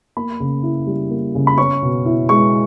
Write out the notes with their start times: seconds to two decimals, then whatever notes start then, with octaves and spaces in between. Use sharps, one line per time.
0.17 A#3 B5
0.40 C#3
0.63 E4
0.87 G3
1.10 A#3
1.35 C#3
1.47 B5
1.58 C#4 C#6
1.82 B2
2.06 E4
2.29 G#3 C#6